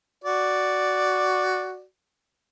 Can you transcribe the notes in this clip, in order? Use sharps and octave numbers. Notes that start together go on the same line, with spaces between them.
F#4 D5